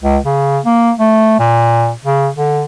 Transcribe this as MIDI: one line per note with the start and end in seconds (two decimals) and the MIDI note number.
0.02 0.18 37
0.25 0.59 49
0.65 0.91 58
0.99 1.38 57
1.39 1.93 46
2.05 2.29 49
2.35 2.65 50